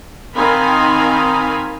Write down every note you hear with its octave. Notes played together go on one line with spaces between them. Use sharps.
D#3 C4 D#4 F5 G#5 B5